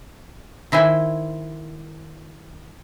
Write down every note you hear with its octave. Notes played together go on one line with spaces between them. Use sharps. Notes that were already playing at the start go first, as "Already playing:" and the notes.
D#3 E4 C5 G#5